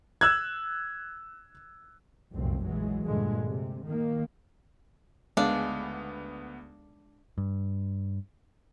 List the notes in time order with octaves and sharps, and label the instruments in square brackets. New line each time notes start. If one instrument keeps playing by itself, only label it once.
[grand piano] E6 F#6 G#6
[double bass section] F1 C2 F#2 A#2 C4
A#1 E3 F#3 G#3
D2 G2 A#2 D3 G#3
C3
D#3 A#3
[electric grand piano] D2 B3 [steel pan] G#3 [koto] D4 [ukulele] F5
[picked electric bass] G2